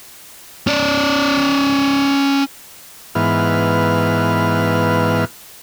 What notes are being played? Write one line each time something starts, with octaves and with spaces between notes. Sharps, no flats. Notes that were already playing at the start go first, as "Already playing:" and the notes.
C#4 D5
G#2 E3 B3 F6